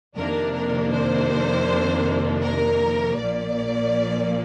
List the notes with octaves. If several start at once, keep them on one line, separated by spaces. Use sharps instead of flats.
F2 C3 D#3 A#3 D4 A#4
A#4
C5
A#4
A#1 A#2 F3 A#3 D5